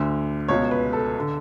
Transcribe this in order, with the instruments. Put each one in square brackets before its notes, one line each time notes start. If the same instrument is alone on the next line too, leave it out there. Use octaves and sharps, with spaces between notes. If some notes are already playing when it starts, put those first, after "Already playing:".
Already playing: [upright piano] D2 D3
C#2 B2 C#5
B4
A4
D3